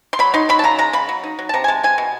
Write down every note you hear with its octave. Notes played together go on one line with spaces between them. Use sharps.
C6
F#3 B5
D#4 C6
F#3 B5
A5
C#3 A#5
G#3 A#5
C#3 B5
F#3
D#4
F#3
A5
C3 A#5
G#5
G#3 A5
C3 G#5
B2